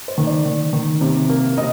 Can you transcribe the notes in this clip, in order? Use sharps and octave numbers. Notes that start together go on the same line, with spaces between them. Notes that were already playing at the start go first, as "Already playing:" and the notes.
C5
D#3
D5
D#3
D#3
C3
A#3
C3 D#5